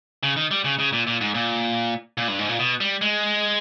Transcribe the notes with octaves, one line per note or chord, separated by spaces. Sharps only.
C#3
D#3
G3
C#3
C#3
A#2
A#2
G#2
A#2
A#2
G2
G#2
A#2
B2
G3
G#3